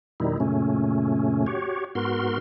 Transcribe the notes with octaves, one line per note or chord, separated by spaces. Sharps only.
F2 B2 D#3 G3 D#4 E4
F#2 A#2 C#3 A3 C#4
F#4 G4 C#5
G#2 B3 F#4 A#4 C6